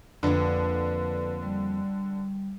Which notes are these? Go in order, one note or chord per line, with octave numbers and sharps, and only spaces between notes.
F2 D3 A#3 B4
G3